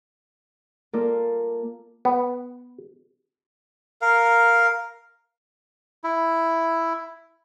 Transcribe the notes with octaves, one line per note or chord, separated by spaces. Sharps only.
A#3 F4 A4 A#4 D5
B3
A#4 F5
E4